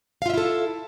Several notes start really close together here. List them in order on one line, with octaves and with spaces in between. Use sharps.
F5 F4 E5 E4 A4